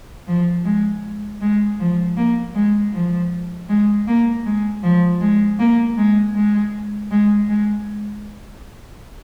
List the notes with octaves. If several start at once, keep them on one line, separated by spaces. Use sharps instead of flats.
F3
G#3
G#3
F3
A#3
G#3
F3
G#3
A#3
G#3
F3
G#3
A#3
G#3
G#3
G#3
G#3